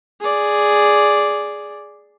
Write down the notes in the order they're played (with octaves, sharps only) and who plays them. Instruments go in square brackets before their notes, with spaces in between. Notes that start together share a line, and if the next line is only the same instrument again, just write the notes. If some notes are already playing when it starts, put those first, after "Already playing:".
[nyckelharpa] G#4 D5